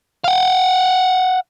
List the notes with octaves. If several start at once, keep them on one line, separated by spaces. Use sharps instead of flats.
F5 F#5